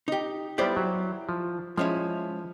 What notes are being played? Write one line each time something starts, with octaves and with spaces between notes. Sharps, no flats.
D#4 G4
G3 B3 E4 G4 C5 D5
F#3
F3
F3 G#3 C#4 E4